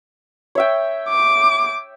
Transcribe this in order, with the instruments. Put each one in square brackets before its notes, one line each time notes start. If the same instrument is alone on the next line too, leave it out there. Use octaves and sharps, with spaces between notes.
[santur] C#5 E5 G5
[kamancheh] D6